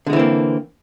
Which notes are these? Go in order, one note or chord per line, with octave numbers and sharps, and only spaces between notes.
D3 E3 G#3 A#3 C4